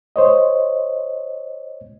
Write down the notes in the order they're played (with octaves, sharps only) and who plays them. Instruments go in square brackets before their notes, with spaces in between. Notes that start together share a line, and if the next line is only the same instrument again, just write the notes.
[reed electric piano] C5 C#5 D#5